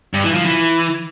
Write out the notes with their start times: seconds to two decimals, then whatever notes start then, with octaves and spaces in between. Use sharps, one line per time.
0.14 G2
0.24 E3
0.35 F3
0.45 E3